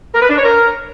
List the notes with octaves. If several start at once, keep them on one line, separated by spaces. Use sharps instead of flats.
A#4
B4
D4
C#5
A#4